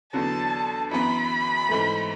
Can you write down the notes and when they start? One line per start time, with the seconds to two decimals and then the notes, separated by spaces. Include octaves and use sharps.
0.13 E2 D3 F#3 A5
0.91 F#2 E3 B3 B5
1.69 G#2 E3 A3